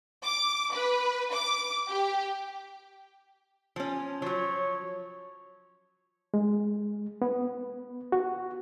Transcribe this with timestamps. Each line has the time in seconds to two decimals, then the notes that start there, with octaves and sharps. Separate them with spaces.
0.24 D6
0.74 B4
1.34 D6
1.89 G4
3.76 F3 C#4
4.22 F3 F#3 C#5
6.34 G#3
7.22 B3
8.12 F#4